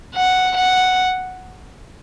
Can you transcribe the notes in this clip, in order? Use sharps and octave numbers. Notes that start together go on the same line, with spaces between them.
F#5
F#5